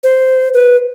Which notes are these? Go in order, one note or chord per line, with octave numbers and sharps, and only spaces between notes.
C5
B4